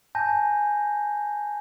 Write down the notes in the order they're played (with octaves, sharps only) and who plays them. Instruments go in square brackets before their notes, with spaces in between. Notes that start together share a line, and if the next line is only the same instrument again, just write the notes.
[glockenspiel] G#5 A5 G6 A#6